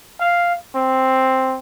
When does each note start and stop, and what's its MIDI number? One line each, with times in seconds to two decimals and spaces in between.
0.20 0.53 77
0.75 1.58 60